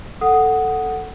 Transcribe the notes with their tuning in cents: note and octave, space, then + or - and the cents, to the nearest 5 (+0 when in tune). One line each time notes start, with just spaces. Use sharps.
A4 +5 F#5 +5 D#6 +0